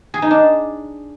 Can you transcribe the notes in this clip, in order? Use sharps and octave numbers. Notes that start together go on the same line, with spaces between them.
G#4
D#4
D4